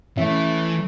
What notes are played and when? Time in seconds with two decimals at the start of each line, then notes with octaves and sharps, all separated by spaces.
0.17 E3 A3 C#4 E5